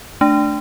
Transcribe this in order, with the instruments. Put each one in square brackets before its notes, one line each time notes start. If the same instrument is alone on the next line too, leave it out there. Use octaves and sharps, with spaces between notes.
[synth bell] A3 D4